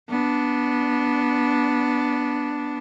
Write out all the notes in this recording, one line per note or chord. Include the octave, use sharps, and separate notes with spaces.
B3 D4